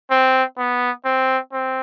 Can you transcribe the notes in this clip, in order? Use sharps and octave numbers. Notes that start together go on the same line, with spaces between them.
C4
B3
C4
C4